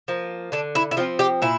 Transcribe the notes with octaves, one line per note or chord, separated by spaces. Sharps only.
F3 A#3
D3 D4
E4
E4
F3 C4 F4
G4
A#2 E4